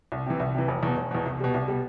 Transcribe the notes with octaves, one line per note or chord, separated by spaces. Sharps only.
C2
C3 E3
C2
C3 E3
F1
E2 B2
F1
E2 B2
C2
B2 G3
C2
B2 G3